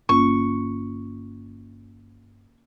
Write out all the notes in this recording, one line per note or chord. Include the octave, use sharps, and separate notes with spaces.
G1 A#3 C#4 F4 C#6